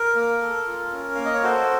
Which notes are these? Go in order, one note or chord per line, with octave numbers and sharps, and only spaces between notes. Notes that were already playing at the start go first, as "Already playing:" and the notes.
Already playing: A#4
A#3
A4
F4
C#4
A#3 F5
D#5
C#5
F#4 A4 C5